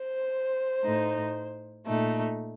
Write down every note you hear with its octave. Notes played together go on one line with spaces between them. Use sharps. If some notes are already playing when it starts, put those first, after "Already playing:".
Already playing: C5
A2 A3 D#4
A#2 A3 D#4